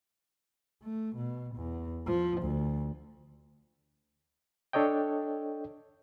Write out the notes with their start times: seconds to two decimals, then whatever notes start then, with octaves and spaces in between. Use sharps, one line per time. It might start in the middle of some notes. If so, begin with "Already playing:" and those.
0.83 A3
1.16 B2
1.56 E2
2.06 F3
2.41 D2
4.73 D4 A4 C#5 D#5 G5